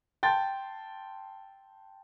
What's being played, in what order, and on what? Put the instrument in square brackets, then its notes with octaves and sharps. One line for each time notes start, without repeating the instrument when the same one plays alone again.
[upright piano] G5 A5 C6 G6 A6